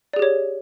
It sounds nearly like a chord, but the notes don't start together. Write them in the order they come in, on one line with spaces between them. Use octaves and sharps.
D5 G#4 G4 C#5